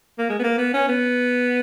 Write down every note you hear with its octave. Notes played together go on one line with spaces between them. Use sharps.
A#3
G#3
B3
A#3
B3
C#4
B3